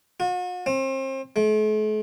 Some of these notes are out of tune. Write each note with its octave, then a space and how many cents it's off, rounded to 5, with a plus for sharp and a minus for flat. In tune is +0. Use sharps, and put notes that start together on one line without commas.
F#4 -45
C4 +35
A3 -45